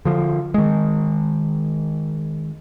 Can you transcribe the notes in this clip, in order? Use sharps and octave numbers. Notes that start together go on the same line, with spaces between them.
D3 F3
D#3 G#3